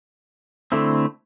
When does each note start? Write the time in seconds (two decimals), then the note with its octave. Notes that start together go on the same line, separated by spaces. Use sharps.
0.72 D3 A3 C4 E4